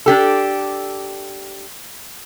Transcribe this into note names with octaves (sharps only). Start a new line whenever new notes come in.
D4 G4 A4